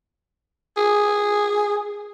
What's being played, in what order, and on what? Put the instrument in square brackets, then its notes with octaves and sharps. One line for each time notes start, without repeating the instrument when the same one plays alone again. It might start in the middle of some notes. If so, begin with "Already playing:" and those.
[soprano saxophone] G#4